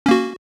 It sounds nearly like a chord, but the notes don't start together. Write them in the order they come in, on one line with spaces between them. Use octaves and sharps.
C#4 A#3 F#4